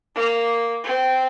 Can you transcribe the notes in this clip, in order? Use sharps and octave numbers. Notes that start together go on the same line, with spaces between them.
A#3
C4